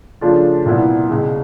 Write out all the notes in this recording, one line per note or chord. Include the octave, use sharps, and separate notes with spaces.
C#3 F3 A3 D4 F4
C2 A#2 G3 B3 E4
C#2 B2 G#3